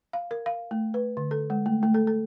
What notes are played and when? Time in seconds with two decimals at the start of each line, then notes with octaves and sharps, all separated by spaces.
0.13 F5
0.31 A#4
0.46 F5
0.71 A3
0.94 B4
1.17 D3
1.31 A4
1.50 G#3
1.66 A3
1.83 A3
1.94 A4
2.07 A4